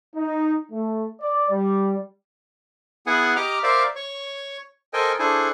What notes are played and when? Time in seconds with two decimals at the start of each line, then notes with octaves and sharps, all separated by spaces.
0.15 D#4
0.71 A3
1.20 D5
1.50 G3
3.07 B3 E4 G#4 F#5 G#5
3.36 G4 D#5 A#5 D6 F6
3.63 A#4 C5 D5 E5 F5
3.96 C#5 C#6
4.93 A4 A#4 C5 D#5 G5 G#5
5.19 D4 E4 G#4 A4 C5 G#5